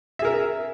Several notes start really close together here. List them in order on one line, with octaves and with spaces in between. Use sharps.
E5 G#4 A#4